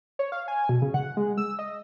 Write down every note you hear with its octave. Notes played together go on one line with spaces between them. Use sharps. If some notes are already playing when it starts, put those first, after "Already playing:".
C#5
F5
G#5
B2
C#3
F#5
G#3
E6
D#5